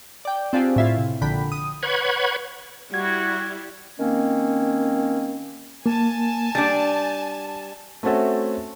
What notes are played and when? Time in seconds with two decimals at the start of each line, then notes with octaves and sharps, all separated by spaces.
0.25 D5 G5
0.53 C4 D4 F4 G4 G#4
0.76 A2 E4 F4
0.98 C3
1.21 A#1 D3 G5 B5
1.52 D#6
1.83 B4 C#5 F#5 B5 C#6 G#6
2.94 G3 E4 F#4 G#6
3.98 D#3 A#3 C4 C#4
5.86 A#3 G#5 A5
6.55 G3 D4 A6
8.03 A3 C4 C#4 F#4 A4 E5